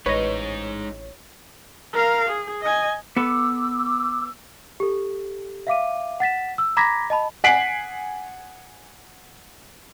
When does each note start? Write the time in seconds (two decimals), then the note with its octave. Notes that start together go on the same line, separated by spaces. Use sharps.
0.06 A1 G#3 D#4 B4 C#5 D#5
1.93 A#4 F5
2.29 G#4
2.62 D#5 G#5
3.17 B3 A4 B4 D6 E6
4.80 G4 A4
5.67 E5 F5 D6 D#7
6.20 F#5 A6 B6 E7
6.58 E6
6.77 A#5 B5 D6 G#6 A#6 B6
7.10 D#5 A5 B5
7.44 F#5 G#5 B6 C7 D7 F#7